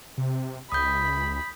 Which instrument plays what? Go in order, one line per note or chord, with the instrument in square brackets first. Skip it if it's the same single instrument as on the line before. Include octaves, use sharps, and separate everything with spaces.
[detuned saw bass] C3
[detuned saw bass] C#2 [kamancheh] B5 [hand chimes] D#6 G6